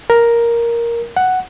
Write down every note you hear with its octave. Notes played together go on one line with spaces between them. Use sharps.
A#4
F#5